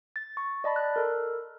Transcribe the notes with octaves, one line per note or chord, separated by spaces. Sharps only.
A6
C#6
D5 D#5 A5 B5
F#6
A4 A#4